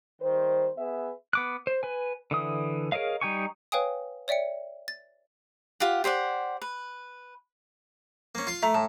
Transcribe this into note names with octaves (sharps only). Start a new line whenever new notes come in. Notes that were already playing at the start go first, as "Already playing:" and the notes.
D#3 G3 C5
B3 G#4 B4 E5
B3 D6 F#6
C5
B4 G#5
D3 E3 D#6
G#4 A#4 C#5 D#5 F5
G3 D#4 G5 G#5 C#6
B4 C#5 F5 G5 G#5 D#6
C#5 D5 E5 G5 C#7
A6
F4 G4 F#5
G4 C5 D5 F#5
B4
A#3 C#4
F4 C6
A3 E5 A#5
A2 A5